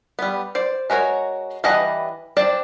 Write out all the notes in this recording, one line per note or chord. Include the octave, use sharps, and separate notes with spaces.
G3 B3
C5 D5
G#3 F#4 A#4 B4 C#5
E3 G3 D4 D#5 F#5
C4 D4 D5 A5